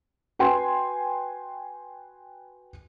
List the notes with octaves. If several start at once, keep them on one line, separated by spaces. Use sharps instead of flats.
F#4 B4 G5 G#5 C6